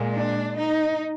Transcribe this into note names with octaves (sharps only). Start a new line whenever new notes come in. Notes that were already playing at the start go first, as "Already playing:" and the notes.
Already playing: A#2 G#3
D4
D#4